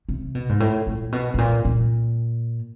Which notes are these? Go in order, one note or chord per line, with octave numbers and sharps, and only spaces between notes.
C3
B2
G#2
A2
A#2
B2
A2
A#2
A#2